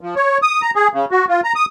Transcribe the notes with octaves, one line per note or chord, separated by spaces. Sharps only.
F3
C#5
D#6
A#5
G#4
C#3
F#4
F4
A#5
D#6